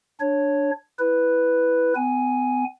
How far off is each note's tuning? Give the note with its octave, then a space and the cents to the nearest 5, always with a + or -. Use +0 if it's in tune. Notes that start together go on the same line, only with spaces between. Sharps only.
D4 +0 C#5 +0
E4 +0 B4 +0
B3 +40 G#5 +0